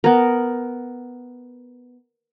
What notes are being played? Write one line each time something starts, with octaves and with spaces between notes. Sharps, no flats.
B3 A#4